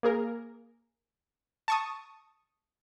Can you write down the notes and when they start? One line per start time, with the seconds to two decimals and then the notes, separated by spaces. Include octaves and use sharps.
0.03 A#3 G#4 A#4
1.68 A5 C#6 D#6